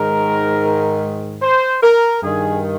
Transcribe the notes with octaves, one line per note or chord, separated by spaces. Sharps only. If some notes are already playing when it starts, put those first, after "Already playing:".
Already playing: G#2 D#3 A#4
C5
A#4
G2 D#3 G#4